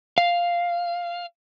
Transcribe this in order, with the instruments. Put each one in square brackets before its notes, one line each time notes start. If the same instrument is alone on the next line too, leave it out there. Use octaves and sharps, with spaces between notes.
[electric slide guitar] F5